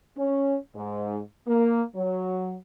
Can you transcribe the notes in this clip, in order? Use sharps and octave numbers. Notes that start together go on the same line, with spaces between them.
C#4
G#2
A#3
F#3